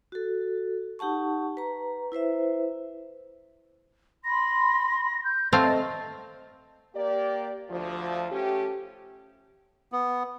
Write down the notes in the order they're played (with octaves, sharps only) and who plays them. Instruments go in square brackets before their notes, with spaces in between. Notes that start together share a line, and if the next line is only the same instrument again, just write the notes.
[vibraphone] F#4 A4
D#4 G4 F#5 A5 C#6
B4 A#5
E4 B4 C5 E5
[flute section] B5 C6 [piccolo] A#6
[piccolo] G6
[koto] A3 C4 F5 [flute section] D5 D#5 [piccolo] A6
[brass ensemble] A#3 G4 D5
D2 F3
A3 C#4 G4
[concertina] B3